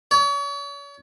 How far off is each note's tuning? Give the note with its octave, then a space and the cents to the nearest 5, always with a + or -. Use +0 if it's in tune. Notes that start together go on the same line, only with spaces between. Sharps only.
C#5 +40